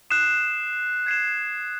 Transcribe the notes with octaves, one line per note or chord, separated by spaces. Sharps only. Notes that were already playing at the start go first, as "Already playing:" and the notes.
D#6 F#6 C7 E7
G#6 C7 E7